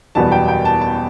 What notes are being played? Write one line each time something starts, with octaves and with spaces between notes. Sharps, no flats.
F#1 E2 B2 G3 B3 A5
G5
G5
A5
A5